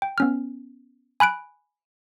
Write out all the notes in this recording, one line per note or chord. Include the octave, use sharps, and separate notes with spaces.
G5
B3 C#4 F6
G#5 B5 F#6 D7